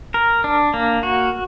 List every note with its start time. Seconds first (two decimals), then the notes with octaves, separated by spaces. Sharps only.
0.14 A#4
0.44 D4
0.74 A#3
1.03 F#4